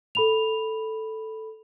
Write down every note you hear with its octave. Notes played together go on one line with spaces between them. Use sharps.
A4 B5 F7